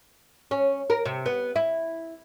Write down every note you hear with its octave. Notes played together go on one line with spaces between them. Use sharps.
C#4
A#4
C3
B3
E4